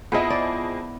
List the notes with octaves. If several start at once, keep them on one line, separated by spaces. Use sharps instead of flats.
F2 B3 E4 G#4 D#5
D5